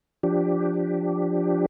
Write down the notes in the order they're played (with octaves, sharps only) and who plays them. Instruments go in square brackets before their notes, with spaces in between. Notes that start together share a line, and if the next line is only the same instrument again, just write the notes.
[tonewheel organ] F3 D4 G4